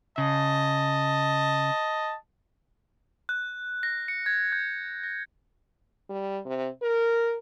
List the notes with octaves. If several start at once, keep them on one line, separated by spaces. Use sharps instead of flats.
C#3 D#5 A5
F#6
A#6
C#7
G#6
G6
A#6
G3
C3
A#4